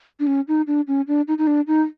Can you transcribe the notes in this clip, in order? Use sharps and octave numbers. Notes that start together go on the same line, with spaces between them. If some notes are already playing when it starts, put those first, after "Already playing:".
D4
C#4
D#4
D4
C#4
D4
D#4
D#4
D4
D#4